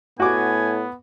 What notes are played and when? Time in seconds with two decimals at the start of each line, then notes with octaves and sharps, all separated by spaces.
0.20 A2 B3 F#4 G#5 D6